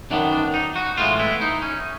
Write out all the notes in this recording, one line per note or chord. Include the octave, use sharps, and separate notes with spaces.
F#2 D#3 F#3 B3 D4
D4
D#4
F#4
A2 E3 G#3 B3 F4
E4
D#4
C#4